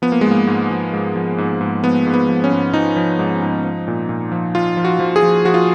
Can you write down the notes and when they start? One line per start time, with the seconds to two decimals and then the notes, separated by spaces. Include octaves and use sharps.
0.02 F3 B3
0.12 A#3
0.21 G#3
0.26 G#2
0.31 A#3
0.47 G#2
0.70 F3
0.93 G#2
1.16 F3
1.38 G#2
1.61 G#2
1.83 F3 B3
2.06 G#2
2.14 B3
2.28 F3
2.44 C#4
2.52 G#2
2.73 F3 D#4
2.96 F3
3.19 G#2
3.42 G#2
3.64 F3
3.88 A#2
4.09 A#2
4.32 F3
4.55 F3 F4
4.77 F3
4.85 F#4
5.00 F3
5.16 G#4
5.23 F3
5.45 F3 F#4
5.54 F4